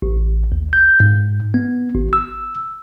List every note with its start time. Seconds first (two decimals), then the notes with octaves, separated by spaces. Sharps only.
0.02 A1
0.52 D#2
0.73 G6
1.00 G#2
1.54 B3
1.95 G#1
2.13 E6